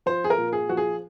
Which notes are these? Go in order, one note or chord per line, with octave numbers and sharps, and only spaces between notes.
F3 C5
G#4
A#4
A#2
G#4
F3 F#4
G#4